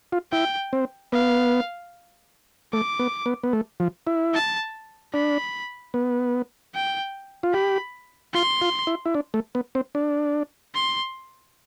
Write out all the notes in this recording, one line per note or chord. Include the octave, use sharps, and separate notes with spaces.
F4
E4 G5
C4
B3 F5
A3 D6
B3
B3
B3
A3
F3
E4
A5
D4 B5
B3
G5
F4
G4 B5
F4 C6
F4
E4
E4
D4
A3
B3
C4
D4
C6